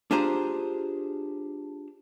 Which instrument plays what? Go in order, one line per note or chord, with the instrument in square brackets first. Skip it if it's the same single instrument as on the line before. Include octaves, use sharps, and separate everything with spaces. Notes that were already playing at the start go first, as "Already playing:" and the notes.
[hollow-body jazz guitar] D4 F4 G4 G#4 C5 A#5